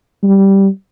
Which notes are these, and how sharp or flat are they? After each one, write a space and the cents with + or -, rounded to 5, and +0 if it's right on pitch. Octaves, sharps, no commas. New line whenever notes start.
G3 -5